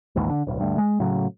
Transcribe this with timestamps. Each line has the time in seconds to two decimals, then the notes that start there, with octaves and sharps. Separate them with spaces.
0.16 D#1 A1 D#2 G#2
0.30 D3
0.47 D1 B1
0.60 D2 G2
0.78 G#3
1.00 A2 C#3 F#3